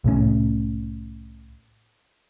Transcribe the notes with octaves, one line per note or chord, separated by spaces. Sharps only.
C2 A2 F#3 C#4